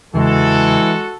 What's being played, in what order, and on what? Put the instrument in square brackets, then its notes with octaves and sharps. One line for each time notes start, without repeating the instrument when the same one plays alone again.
[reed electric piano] E2 C#3 [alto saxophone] E3 [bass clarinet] G#3 [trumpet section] F#4 A4